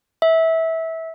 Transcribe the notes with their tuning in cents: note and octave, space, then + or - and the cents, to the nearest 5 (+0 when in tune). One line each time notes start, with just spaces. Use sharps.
E5 -20